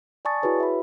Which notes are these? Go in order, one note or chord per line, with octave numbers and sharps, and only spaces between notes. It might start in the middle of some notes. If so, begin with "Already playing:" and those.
D5 G#5 A5 C#6 D#6 A6
E4 F#4 G#4 B4 C#5
E5 B5